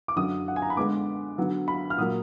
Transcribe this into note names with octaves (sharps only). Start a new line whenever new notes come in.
D6
F#2 D3 F#3 D#6
F#5
G#5
A#5
B5
D3 G#3 B3 D6
D3 F#3 B3
B5
F6
A#2 F#3 A#3 D#6